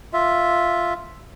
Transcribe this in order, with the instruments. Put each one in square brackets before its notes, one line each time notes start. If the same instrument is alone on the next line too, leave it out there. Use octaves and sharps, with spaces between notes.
[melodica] F4 E5